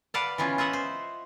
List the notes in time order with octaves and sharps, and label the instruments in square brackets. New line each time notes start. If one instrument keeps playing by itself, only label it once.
[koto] B4 D5 F5 F#5 A5
E3 B3 C#4 F4
F4 D#5 E5 F#5
C5